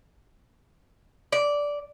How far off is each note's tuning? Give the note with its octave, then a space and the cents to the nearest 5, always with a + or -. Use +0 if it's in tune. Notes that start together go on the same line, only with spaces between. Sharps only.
D5 -10